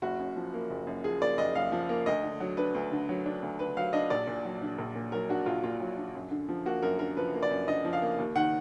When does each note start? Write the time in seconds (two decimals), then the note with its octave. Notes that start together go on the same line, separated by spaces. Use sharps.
0.02 F#1 F#4
0.19 F#2
0.36 F3
0.54 A#3
0.70 F#1
0.87 F#2
1.04 F3 G#4
1.21 A#3 D5
1.38 F#1 D#5
1.55 F#2 F5
1.72 F3
1.89 A#3
2.06 D2 D#5
2.23 D3
2.40 F#3
2.57 D4 B4
2.75 D2
2.91 D3
3.09 F#3
3.26 D4
3.42 D2
3.59 D3 B4
3.77 F#3 F5
3.93 D4 D#5
4.10 A#1 D5
4.27 A#2
4.45 F#3
4.62 D4
4.78 A#1
4.95 A#2
5.12 F#3 A#4
5.29 D4 F#4
5.46 A#1 F4
5.63 A#2 F4
5.81 F#3
5.97 D4
6.15 F#2
6.31 D3
6.49 F3
6.66 A#3 F#4
6.82 F#2 A#4
6.99 D3 A#4
7.17 F3 B4
7.34 A#3
7.43 D5
7.50 F#2
7.67 D3 D#5
7.85 F3
7.93 F5
8.02 A#3
8.18 D#2
8.35 D#3 F#5